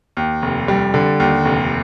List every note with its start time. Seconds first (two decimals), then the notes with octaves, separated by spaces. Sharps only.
0.17 D#2
0.42 F1
0.68 G3
0.94 D3
1.20 D#2
1.45 F1